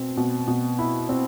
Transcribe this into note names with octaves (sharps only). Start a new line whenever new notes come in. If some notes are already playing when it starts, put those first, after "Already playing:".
Already playing: B2 C4
B2
B2
E4
C4